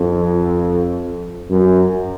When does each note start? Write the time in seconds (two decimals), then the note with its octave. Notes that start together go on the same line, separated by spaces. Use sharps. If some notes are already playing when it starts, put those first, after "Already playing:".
Already playing: F2
1.50 F#2